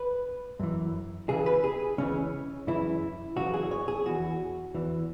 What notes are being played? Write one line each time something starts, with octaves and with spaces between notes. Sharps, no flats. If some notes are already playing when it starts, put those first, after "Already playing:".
Already playing: B4
F#2 E3
C#2 C#3 E3 G#4
B4
G#4
C#2 C#3 E3 C#4
F#2 C#3 E3 E4
F#2 C#3 E3 F#4
G#4
C#5
G#4
E2 E3 F#4
E2 E3